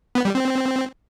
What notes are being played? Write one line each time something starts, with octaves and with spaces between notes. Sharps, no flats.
B3
G3
C4